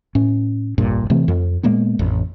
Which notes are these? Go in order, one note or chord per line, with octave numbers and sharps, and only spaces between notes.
A2 C#4
F1 A#1 G2 A#2
C3 E3 A3 C4
F2
A#2 G#3 A#3 B3
A1 F2